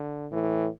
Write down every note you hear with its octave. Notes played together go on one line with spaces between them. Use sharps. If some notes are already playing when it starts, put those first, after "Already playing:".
Already playing: D3
A2 E3